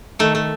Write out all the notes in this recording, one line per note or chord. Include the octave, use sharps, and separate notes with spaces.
D#3 A3
A3